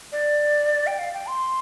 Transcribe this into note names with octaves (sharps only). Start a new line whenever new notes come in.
D5
G5
F5
G5
C6